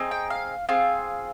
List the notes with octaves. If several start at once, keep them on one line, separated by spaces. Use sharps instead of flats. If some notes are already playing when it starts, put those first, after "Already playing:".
Already playing: C4 D#4 G#4
G5
F5
C4 F4 G#4 F5